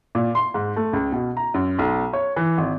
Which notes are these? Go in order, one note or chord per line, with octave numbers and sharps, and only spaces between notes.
A#2
C6
G#2
A3
C#2
B2
A#5
F#2
B1
C#5
E3
G#1